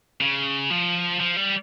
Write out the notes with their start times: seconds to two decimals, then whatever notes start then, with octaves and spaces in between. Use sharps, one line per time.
0.21 C#3
0.70 F3
1.20 F3
1.37 G3